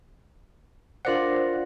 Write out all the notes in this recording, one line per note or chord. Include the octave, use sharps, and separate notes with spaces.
D4 F4 A#4 C5 D5 F#5